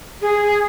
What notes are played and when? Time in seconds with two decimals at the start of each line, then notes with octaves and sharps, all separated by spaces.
0.22 G#4